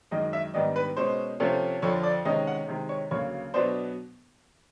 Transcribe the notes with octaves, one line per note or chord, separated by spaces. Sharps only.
F#2 D#3 G#3 D#5
E5
G#2 D#3 G3 B3 D4 D#5
B4
B2 G#3 C#4 C5
C3 F3 A3 C#4
F2 D3 F3 C#5
D5
C3 D#3 G#3 C#4 D#5
F#5
C3 D#3 G#3
C#5
D2 C#3 F#3 A#3 C#5
B2 F#3 B3 D4 C5